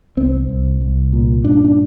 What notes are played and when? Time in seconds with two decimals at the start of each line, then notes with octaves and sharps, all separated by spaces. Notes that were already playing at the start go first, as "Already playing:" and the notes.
0.17 C2 C4
0.48 C2
0.81 C2
1.13 A#2
1.44 G2 D4
1.65 D4